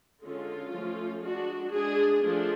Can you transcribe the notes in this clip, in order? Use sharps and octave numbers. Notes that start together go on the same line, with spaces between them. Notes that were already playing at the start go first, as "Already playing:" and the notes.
D3 G#3 C#4 F4
F3 A3 C#4
G#3 D4 F#4
G#3 D4 G#4
F3 A3 D4